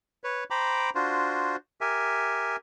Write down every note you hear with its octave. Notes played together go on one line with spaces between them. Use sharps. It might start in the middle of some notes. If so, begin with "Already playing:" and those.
B4 C#5
C5 G5 A#5 B5 D6
D4 F4 F#4 C5
G4 A#4 E5 G#5